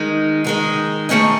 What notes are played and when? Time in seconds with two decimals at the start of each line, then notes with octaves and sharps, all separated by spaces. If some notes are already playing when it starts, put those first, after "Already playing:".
Already playing: D#3 G#3 D#4
0.44 D#3 G#3 D#4
1.09 D#3 A3 C#4 G#4 D#5